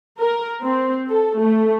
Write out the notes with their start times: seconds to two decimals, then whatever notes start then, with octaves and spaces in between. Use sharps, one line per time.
0.19 A#4
0.62 C4
1.09 A4
1.39 A3